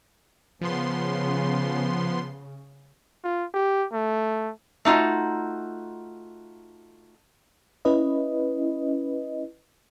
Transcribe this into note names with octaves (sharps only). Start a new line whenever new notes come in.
C#3 F3 B3 C6
F4
G4
A3
A3 D#4 F4 F#4
C#4 E4 B4 D#5